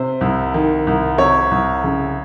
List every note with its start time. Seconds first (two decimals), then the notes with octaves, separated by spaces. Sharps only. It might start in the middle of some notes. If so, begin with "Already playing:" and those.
Already playing: C3 C5
0.21 C2
0.54 D#3
0.87 C2
1.18 C3 C#5
1.51 C2
1.84 C#3